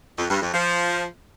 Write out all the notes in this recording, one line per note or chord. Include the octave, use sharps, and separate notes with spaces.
F2
G2
F2
F3